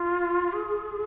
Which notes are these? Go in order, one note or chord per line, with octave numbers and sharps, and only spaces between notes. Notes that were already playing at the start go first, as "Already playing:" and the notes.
Already playing: F4
G#4